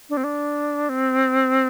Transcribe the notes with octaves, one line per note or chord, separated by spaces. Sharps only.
D4
C4
D4
C4